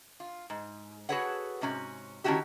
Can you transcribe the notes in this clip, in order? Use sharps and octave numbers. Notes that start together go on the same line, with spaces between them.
F4
G#2
F#4 G#4 A4 B4 C#5 F#5
G#2 C3 C#4 F#4
D#3 A3 C#4 E4 F#4 G4